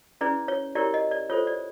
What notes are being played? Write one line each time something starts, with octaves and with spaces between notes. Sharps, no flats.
C#4 E4 G#4 B4 D5
C#5
E4 G4 A#4 C#5 D5
D#5
D5
F4 A4 C5 C#5
D5